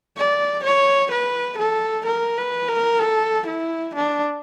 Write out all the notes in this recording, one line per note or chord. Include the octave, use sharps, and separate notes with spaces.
D5
C#5
B4
A4
A#4
B4
A#4
A4
E4
D4